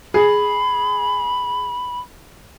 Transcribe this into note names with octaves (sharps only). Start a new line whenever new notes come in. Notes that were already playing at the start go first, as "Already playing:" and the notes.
G#4 B5